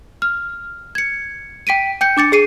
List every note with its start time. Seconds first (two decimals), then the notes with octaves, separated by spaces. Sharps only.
0.22 F6
0.95 G#6 C#7
1.67 G5 B6 D7 D#7
2.01 G5 G6 C#7
2.17 D4 D6 A6 C#7
2.32 G#4 C7 D#7